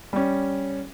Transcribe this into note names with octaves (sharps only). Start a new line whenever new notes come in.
G3 C#4